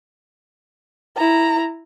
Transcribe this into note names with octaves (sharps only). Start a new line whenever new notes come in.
E4 A#5